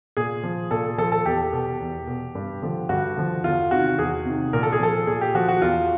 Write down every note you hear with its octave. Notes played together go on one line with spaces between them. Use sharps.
A#2 G#4
F3
A#2 A4
F3 A4
A4
E2 G4
B2
E2
B2
G2
D3 F3
G2 F#4
D3 F3
E2 F4
C3 D#3 F#4
E2 G#4
C3 D#3
A#2 A#4
A4
G#4
F3 A4
A#2 G#4
G4
F3 F#4
F#4
E2 F4